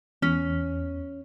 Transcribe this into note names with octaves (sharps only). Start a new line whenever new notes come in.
E2 C#4